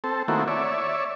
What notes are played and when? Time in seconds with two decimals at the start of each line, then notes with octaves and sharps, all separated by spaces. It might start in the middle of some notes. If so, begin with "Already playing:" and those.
0.04 C4 A4
0.28 D#3 A3 A#3 C4 E4 F#4
0.48 C#5 D5 E5